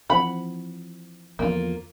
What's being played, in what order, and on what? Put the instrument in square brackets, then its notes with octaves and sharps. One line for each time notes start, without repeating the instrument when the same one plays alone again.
[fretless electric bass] E3 F3 C4 [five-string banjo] F#5 B5
[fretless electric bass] E2 D3 F3 [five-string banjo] A#3 F4